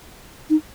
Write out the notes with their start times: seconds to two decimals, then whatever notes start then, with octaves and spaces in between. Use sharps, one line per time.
0.50 D#4